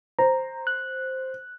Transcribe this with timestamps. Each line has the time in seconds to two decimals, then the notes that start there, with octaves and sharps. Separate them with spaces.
0.19 C5 A#5
0.67 F#6